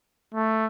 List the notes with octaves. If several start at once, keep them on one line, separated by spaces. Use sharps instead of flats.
A3